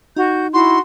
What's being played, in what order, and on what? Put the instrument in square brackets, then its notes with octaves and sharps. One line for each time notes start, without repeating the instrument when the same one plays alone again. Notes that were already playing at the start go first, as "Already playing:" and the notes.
[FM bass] D#4 [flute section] F#4 G6
[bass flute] E4 [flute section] F#4 [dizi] C6